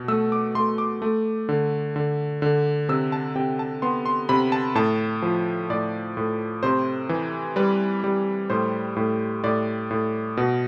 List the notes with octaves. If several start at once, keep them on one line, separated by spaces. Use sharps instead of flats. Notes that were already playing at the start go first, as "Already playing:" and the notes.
Already playing: B2
A3 E6
D6
A3 C6
D6
A3
D3
D3
D3
C3 E6
A5
C3 G5
A5
B3 C6
C6
C3 B5
A5
A2 A5
F3
A2 D5
A2
C3 C5
E3
G3 B4
G3
A2 C5
A2
A2 D5
A2
B2